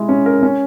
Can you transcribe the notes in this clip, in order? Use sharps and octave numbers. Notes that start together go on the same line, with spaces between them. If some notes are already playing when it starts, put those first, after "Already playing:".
Already playing: G#3 E4
C#4
A#4
C#4